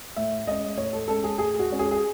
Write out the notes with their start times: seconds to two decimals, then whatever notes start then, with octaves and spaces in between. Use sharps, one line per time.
0.16 A2 E5
0.47 G#3 C#4 D#5
0.77 A2 C#5
0.93 A4
1.08 G#3 C#4 A4
1.24 G#4
1.38 A2 G#4
1.59 F#4
1.69 G#3 C#4
1.79 G#4
1.91 G#4